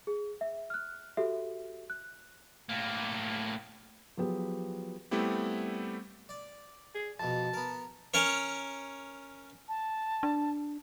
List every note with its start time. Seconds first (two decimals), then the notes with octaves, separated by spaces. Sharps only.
0.07 G#4
0.41 E5
0.70 F6 F#6
1.17 F#4 G4 A4 E5
1.90 F#6
2.69 A2 A#3
4.17 F3 F#3 B3 G4 G#4
5.11 G3 A3 B3 C4 E4 G4
6.29 D5
6.95 G#4
7.20 F2 B2 A5
7.53 B3 A#4
8.14 C#4 A#4 C#5
9.69 A5
10.23 D4